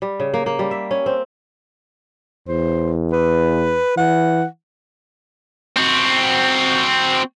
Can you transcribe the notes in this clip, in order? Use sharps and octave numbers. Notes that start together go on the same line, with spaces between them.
G3
C#3
A#3
A#3
G3
E5
C#4
C4
E2 C5
B4
E3 F#5
C4 F#4